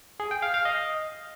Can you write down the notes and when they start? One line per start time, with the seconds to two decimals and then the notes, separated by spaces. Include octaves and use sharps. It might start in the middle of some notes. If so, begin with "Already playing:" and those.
0.20 G#4
0.31 G5
0.42 F5
0.54 F5
0.65 D#5